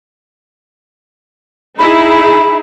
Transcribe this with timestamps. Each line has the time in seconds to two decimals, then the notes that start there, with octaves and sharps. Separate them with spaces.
1.79 D#4 E4 G#4 B5
2.09 B5